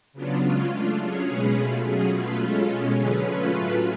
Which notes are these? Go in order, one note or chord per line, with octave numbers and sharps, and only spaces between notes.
C#3 F#3 B3 D4 F4
C#3 G#3 C#4 F4
A3 D4 F4
F#3 C#4 G#4 C#5
B2 G#3 C#4 G#4 B4
B2 A3 F4
F#3 C#4 G#4
B2 A3 F4 B4
G#3 C#4 F4 A4
B2 G#3 C#4
D3 F#3 C#4 G#4 B4
A3 C#4 F4 B4
A2 F#3 A3 F4 B4